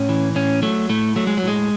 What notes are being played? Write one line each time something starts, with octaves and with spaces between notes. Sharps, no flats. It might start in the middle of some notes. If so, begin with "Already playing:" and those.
Already playing: A2 C#4
E3
A2 C#4
F#3 A3
A2 A3
F#3 A3
G#3
F#3
A2 G#3